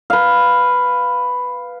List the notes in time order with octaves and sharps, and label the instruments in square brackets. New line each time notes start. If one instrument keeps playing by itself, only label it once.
[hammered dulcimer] B4 F5